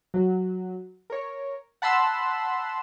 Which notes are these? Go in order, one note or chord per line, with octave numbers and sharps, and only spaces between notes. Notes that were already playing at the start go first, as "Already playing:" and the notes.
F#3
A#4 C#5
F#5 A5 B5 C6 E6